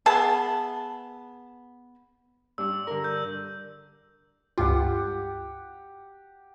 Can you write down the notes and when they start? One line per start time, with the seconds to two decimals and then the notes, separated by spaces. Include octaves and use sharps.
0.06 B3 G#4 E5 A5
2.58 G2 D4 E6
2.87 D3 A#4
3.04 G6
4.58 C#2 G2 F4 G4 F#5